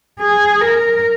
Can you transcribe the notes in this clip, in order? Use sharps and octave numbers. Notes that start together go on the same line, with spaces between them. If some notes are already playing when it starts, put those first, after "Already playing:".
G#4
A#4